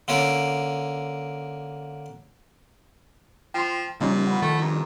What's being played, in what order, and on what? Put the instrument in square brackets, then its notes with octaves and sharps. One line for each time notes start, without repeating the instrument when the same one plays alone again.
[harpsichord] D3 A#3 C#4 A#4
[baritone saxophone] F3 [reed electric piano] G5 C6
[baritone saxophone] A#2 [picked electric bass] C#3 F3 G3 [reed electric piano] A#3 C#4 D#4
[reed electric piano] F#5 B5
[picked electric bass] C3 D#3 F3 [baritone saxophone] A3
[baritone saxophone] G2 [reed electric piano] A#5